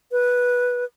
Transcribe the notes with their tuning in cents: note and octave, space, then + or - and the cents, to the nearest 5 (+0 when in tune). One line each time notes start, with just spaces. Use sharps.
B4 -10